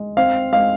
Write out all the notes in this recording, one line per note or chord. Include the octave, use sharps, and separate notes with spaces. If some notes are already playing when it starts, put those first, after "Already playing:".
Already playing: G#3
C4 F5
G#3 F5